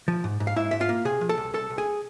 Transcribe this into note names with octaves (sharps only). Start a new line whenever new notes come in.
F3
G#2
G#2
F5
G#2 E4 E5
G#2 E5
F4 F5
A#3
C3 G#4 G#5
F3
A4 A5
C2
C2 A4 A5
C2
G#4 G#5